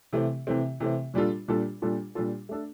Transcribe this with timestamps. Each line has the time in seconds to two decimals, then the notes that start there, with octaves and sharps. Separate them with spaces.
0.13 C3 E3 A3 C4
0.47 C3 E3 A3 C4
0.80 C3 E3 A3 C4
1.14 A#2 G3 D4 F4 A4
1.48 A#2 G3 D4 F4 A4
1.82 A#2 G3 D4 F4 A4
2.15 A#2 G3 D4 F4 A4
2.49 A3 D4 A4